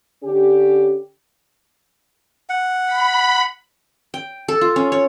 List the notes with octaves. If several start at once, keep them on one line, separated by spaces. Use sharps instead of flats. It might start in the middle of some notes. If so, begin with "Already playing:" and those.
D3 C#4 G4
F#5
B5
G5
A4
F4
C#4
C#5